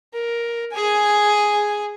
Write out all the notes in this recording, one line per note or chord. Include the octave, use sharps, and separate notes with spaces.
A#4
G#4 G#5